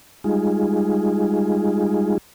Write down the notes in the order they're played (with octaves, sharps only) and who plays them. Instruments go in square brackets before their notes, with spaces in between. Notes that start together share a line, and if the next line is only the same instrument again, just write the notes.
[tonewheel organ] G3 G#3 D#4 F4 G#4